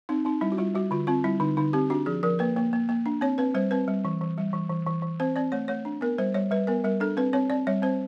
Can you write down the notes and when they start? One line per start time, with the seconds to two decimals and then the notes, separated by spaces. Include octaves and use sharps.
0.09 C4 D#4
0.25 C4 D#4
0.41 G3 E4
0.52 F#4
0.58 G3 F4
0.75 G3 F#4
0.91 D3 F4
1.07 C4 F4
1.24 G3 E4
1.40 D3 D#4
1.57 D3 D#4
1.73 C4 G4
1.90 D4 F#4
2.06 F3 G#4
2.23 F3 A#4
2.39 A#3 B4
2.56 A#3
2.73 A#3
2.89 A#3
3.06 D4
3.21 C4 C#5
3.38 C4 B4
3.54 G3 C5
3.71 C4 B4
3.88 G3
4.05 E3
4.21 E3
4.38 G3
4.53 E3
4.70 E3
4.87 E3
5.02 E3
5.20 C4 C5
5.36 C4 D5
5.52 A3 C#5
5.68 A3 C#5
5.85 D4
6.01 B3 A#4
6.18 G3 C5
6.34 G3 C#5
6.51 G3 B4
6.67 B3 A#4
6.84 G3 A#4
7.00 D4 A4
7.17 C4 B4
7.33 C4 C#5
7.50 C4 D5
7.67 G3 C#5
7.82 C4 C5